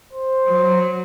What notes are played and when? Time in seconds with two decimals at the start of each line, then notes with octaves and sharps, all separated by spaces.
0.13 C5
0.47 F#3